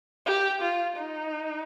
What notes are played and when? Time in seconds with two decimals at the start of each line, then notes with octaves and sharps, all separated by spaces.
0.26 G4
0.62 F4
0.97 D#4